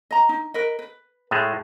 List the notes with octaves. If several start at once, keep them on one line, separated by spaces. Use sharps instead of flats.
D#5 A#5
D#4
A#4 B4 D#5
B4
A2 G#3 A3 G#4